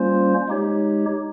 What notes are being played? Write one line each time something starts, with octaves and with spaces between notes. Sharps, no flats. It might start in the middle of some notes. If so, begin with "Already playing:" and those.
Already playing: G3 A#3 C#4 F4 C5
G#3 D#4 G4 C#5